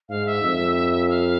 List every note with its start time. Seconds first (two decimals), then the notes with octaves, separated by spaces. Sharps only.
0.09 G#2 F5
0.26 E5
0.42 F2
1.09 F5